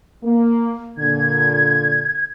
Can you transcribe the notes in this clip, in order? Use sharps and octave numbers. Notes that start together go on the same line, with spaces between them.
A#3
A#2 D3 G#6